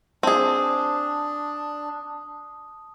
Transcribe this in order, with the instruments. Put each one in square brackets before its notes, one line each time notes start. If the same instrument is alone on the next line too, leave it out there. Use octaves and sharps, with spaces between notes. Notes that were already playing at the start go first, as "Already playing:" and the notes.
[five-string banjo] C4 G#4 [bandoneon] D4 [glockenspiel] A5 D#6